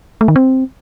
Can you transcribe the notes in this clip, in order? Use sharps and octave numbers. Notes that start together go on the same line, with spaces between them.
A3
D#3
C4